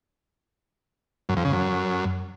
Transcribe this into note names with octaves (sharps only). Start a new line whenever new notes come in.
F#2
F2
C#3
F#2